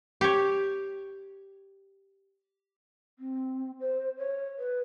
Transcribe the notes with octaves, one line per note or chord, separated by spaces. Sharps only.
G4 C#5
C4
C5
C#5
B4